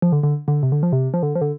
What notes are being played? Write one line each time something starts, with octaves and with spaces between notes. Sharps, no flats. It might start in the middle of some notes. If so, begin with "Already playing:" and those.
F3
D3
D3
D3
C3
D3
F3
C3
F3
D3
F3
D3